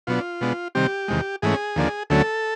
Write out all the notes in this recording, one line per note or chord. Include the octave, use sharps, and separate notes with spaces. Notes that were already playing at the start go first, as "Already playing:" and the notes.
B2 F#3 B3 D4 F4
B2 G#3 B3 D4
C3 D#3 G3 C4 G4
E2 C3 D#3 G#3
G#2 E3 A3 C#4 G#4
D#2 D3 F3 A#3 D4
D2 D3 F#3 A3 C#4 A4